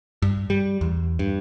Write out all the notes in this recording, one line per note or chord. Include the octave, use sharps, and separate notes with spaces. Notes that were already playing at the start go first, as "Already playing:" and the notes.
G2
G3
E2
G2